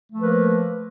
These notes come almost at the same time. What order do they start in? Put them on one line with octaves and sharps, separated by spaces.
A3 F3 A#3 B4 A#4